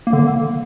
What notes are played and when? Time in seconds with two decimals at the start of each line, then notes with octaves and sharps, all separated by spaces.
0.07 A#3
0.13 D3
0.19 A#3